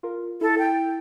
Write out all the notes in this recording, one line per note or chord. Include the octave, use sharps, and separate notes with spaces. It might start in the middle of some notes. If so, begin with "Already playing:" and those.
F4 A#4
E4 A4
G5